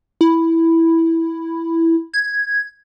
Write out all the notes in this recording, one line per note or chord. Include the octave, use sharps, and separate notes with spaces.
E4
G#6